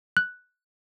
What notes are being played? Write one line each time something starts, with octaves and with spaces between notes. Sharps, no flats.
F#6